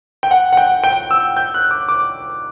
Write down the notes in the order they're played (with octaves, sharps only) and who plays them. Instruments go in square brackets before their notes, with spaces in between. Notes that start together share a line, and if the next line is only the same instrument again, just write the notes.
[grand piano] G5
F#5
F#5
G5
G5
E6
G6
F#6
D6
D6